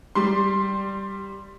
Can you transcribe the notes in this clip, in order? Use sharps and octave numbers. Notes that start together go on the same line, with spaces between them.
G3 C6